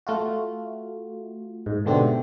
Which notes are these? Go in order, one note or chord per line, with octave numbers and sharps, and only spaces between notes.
A3 F4 F#4
G#2
G#2 B2 D3 A3 C4 G4